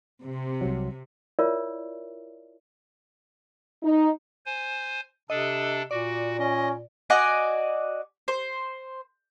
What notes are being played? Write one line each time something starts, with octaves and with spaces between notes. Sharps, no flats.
C3
C2 F#3
E4 F4 A#4 C#5 D5 E5
D#4
C5 G#5
C3 D4 A4 D#5
A#2 F#4 D5
C#4 D#5
F#4 D5 D#5 G#5
C5